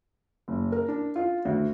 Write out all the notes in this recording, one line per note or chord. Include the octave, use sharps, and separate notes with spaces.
F#1
A#4
D4
F4
D2